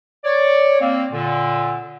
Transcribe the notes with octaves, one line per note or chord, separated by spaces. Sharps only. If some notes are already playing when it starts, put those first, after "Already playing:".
C#5 D5
A#3 C4
A#2 D3